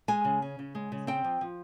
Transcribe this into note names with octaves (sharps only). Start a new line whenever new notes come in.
G#3 G#5
C#3
C#4
C#3
G#3
C#3
C4 G5
F3
F3